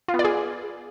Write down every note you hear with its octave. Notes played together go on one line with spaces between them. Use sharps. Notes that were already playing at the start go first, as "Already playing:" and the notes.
F4
B3
D5
G#4